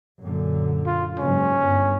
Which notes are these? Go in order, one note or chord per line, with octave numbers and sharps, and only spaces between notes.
F#2 A#2 D3
F4
F#1 G#2 C#4
G1